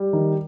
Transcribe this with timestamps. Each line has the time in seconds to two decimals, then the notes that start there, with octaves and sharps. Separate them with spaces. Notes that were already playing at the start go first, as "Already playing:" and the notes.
Already playing: G3
0.13 D#3